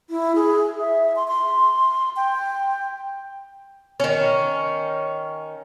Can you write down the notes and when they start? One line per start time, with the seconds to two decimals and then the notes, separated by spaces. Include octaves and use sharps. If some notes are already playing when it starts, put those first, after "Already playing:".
0.10 E4
0.35 G#4
0.80 E5
1.16 C6
1.28 C6
2.16 G5
4.00 D#3 C#4